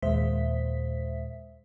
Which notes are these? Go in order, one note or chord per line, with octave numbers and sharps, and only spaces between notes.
D#2 A#2 G#3 C5 E5 B6